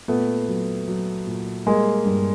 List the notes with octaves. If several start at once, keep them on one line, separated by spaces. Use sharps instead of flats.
A#2 A3 B3
F#3
F#3
A#2
G3 G#3 A#3
G2